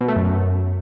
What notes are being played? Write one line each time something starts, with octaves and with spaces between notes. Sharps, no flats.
B2
A3
F#2